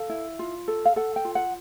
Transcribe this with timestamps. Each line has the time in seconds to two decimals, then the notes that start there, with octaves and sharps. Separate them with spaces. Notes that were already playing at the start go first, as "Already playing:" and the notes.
Already playing: A4 F5
0.09 E4
0.39 F4
0.68 A4
0.85 F5
0.96 A4 F#5
1.16 G5
1.25 F4
1.35 F#5